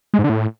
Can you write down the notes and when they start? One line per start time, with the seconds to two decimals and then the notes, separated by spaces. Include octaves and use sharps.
0.14 G#3
0.19 G#2
0.24 D3
0.29 A2